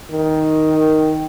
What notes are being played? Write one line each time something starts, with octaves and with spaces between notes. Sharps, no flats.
D#3